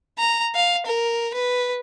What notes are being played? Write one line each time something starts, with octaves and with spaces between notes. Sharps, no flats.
A#5
F5
A#4
B4